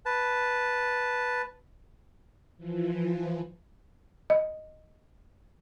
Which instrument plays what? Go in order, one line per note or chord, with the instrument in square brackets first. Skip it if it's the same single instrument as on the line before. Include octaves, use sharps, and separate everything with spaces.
[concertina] B4 A5
[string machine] E3 F3
[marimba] D#5